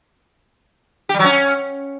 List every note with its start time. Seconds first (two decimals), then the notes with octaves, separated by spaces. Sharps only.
1.09 G4
1.14 G3
1.19 F#3
1.24 C#4